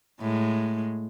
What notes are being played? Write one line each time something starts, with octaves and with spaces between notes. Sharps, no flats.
A2 G#3